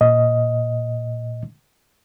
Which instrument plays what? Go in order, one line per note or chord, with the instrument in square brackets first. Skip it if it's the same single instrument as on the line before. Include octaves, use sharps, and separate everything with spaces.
[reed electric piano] A#2 D#5